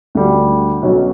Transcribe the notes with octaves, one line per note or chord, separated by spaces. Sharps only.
D2 D3 G3
B1 B2 F#3 C#4